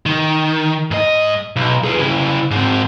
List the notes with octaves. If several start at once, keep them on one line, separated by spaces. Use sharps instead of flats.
D#3
G#2 D#5
B1
G#4 B4
C#3 E4
G#2 C4